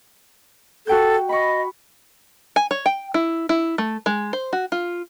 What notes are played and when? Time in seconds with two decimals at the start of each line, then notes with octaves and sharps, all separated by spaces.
0.87 F#4 A4 G5 G6
1.29 D#5 B5 C#6
2.56 G#5
2.71 C#5
2.86 G5
3.14 E4
3.49 E4
3.78 A3
4.06 G#3
4.33 C5
4.53 F#4
4.72 F4